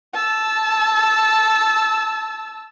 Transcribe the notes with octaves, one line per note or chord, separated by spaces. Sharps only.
A5 E6